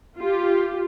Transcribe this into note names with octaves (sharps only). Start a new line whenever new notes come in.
F4 G4